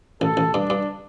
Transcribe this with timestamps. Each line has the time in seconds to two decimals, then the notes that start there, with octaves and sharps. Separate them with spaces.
0.21 A1 A4
0.37 A1
0.53 G2 D4
0.70 G2